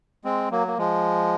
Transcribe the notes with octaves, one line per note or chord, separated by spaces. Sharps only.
G#3 C4
F#3 A#3
A#3
F3 G#3